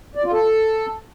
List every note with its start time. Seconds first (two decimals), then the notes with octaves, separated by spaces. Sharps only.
0.15 D5
0.24 F4
0.32 A4